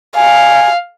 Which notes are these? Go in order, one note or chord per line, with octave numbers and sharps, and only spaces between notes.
F5 G#5